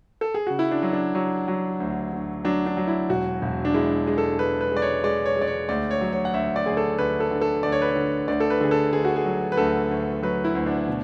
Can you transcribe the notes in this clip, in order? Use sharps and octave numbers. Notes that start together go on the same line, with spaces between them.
A4
G#4
C#3 F#4
E4
D4
F#3
D4
F#3
F#3
D2
D2
F#3 D4
D4
F#3
E4
E1 F#4
E1
D4
G#3 E4
G#3
A4
G#3 B4
B4
G#3 D5
C#5
G#3 D5
C#5
G#3 D5
C#5
D2 D5
C#5
F#3
C#5
F#5
D2 E5
D5
D2 G#4
A4
D2 B4
A4
D3
A4
D2 D5
C#5
B4
D3 C#5
D2 D5
A4
B4
D3 G#4
A4
D2 G#4
F#4
G#4
F#3
B4
D2 A4
D2
F#3 B4
E4
D2
D4
B2